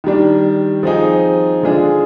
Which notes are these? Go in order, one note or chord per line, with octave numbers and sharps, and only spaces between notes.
D#3 G3 D4
F3 C4 D#4 G#4
D3 G#3 D4 F4 G#4